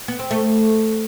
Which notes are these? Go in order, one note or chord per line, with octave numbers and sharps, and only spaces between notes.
B3
C4
A3